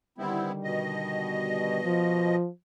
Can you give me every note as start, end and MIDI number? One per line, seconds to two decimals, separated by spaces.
0.18 1.80 50
0.18 1.80 51
0.18 1.80 55
0.18 0.52 59
0.18 0.52 60
0.18 0.52 64
0.64 2.36 47
0.64 2.36 75
1.84 2.45 53